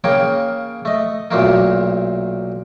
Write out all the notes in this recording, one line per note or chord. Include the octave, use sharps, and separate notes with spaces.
C#3 A#3 C#5 G5
A3 D#5
B1 A#2 A3 A#3